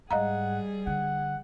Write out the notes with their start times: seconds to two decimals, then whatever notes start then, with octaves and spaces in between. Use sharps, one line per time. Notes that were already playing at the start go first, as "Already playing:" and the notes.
0.11 G#2 G3 G#4 D#5 F5 F#5 A#5
0.87 D3 F#5